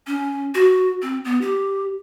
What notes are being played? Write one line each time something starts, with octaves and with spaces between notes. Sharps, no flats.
C#4
F#4
C4
B3
G4